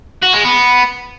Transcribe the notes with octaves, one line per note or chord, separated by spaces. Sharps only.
F#4
G#3
B3